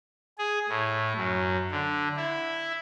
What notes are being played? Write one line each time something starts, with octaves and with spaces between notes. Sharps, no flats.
G#4
A2
F#2
D3
E4